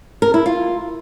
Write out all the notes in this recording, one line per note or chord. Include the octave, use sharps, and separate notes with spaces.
A#4
E4
F4